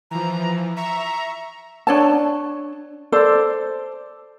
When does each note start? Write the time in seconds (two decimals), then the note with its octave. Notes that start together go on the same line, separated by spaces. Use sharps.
0.11 E3 F3 A#5
0.77 E5 A#5 C#6
1.87 D4 C#5 A5
3.12 A4 C5 D5